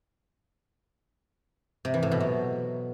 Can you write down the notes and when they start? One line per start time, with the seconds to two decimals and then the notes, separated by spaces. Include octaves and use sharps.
1.85 C3
1.94 E3
2.03 A2
2.11 B2
2.20 F#3